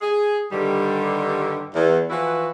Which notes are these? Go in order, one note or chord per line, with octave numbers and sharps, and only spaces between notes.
G#4
G2 D3 D#3 G3
E2
E3 F3 E4 F#4 B4